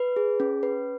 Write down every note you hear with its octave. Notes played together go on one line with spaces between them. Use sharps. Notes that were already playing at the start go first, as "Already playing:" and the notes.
Already playing: B4
G#4
C#4
B4